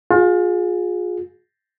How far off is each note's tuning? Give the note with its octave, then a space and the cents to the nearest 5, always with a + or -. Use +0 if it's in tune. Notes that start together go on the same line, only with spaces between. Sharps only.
F4 +35 G#4 +0